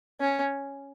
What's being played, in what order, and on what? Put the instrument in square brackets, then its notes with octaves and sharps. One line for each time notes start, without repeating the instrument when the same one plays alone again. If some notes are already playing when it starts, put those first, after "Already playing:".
[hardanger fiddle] C#4